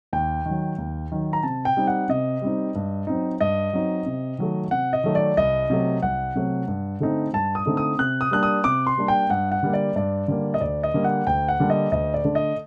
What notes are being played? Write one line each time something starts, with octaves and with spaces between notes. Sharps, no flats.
D#2 G5
D#3 F#3
D#2
D#3 F#3
A#5
C3 A5
G5
G3 C4 D#4
F#5
C3 D#5
G3 C4 D#4
G2
F#3 C4 D#4
G2 D#5
F#3 C4 D#4
C3
D#3 F#3 A3
C3 F#5
D#5
D#3 F#3 A3
D5
C2 D#5
C3 F#3 A3
C2 F#5
C3 F#3 A3
G2
D3 A3 C4 D#4
G2 A5
D#6
D3 A3 C4 D#4
D#6
C3 F#6
D#6
G3 A#3 D4 F#6
D#6
C3 D6
C6
G3 A#3 D4
G5
G2 F#5
F#5
D3 G3 A#3
D5
G2 D5
D3 G3 A#3
D#5
D2 D5
D#5
D3 G3 A#3
F#5
D2 G5
F#5
D3 G3 A#3
D#5
D2 D#5
D5
D3 A3 D4
D#5